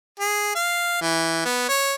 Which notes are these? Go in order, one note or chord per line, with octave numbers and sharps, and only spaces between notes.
G#4
F5
E3
B3
C#5